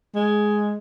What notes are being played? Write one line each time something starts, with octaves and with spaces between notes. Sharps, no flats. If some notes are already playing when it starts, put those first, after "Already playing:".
G#3